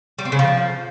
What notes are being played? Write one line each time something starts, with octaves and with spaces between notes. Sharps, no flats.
G3
C4
C#3
F3